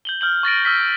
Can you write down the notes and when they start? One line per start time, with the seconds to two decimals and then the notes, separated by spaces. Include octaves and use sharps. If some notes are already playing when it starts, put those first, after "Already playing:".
0.05 G6 F#7 G7
0.21 F6 G6 F#7
0.43 C#6 A6 A#6 D7
0.65 E6 F6 B6